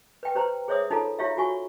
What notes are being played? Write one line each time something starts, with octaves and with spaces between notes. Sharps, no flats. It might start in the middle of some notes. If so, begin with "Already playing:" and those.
B4 G5
G4 B4 C5 A#5
G#4 C5 C#5 E5 D#6 E6
D#4 F4 A4 A#5
E4 F4 G4 C#5 E5 F5
F4 F#4 G#5 C#6